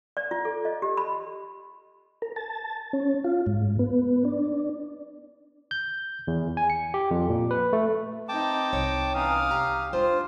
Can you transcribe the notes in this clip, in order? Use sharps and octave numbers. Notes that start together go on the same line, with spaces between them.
D5
F4
A4
D#5
G4
B5
A#4
A5
C#4
F4
G#2
B3
D4
G6
E2
G#5
C#7
G4
F2
A#2
B4
A3
C4 D#4 G5 A5 D6
C2 C#5
E3 C#4 D#4 F5 D#6
G4 A#5
G#3 D4 F4 C5